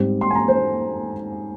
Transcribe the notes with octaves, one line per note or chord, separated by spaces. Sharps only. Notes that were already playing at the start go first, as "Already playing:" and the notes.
Already playing: G#2 G3 C4
C6
G#5
A#5
C5